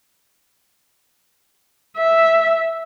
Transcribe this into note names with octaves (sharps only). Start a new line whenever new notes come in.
E5